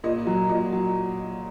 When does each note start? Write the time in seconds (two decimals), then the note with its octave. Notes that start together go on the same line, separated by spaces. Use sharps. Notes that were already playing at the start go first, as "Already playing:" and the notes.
0.04 A#2 D#5
0.27 F#3
0.49 A#2 D#5
0.72 F#3